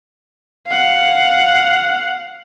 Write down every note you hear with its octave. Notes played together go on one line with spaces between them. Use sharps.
F5 F#5